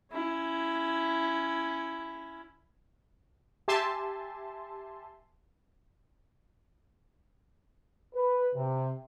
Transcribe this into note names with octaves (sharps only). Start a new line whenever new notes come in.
C#4 E4
G4 E5 G#5 A5 C6
B4
C3